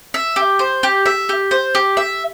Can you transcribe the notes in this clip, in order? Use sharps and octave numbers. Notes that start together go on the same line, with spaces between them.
E5
G4
C5
G4
E5
G4
C5
G4
E5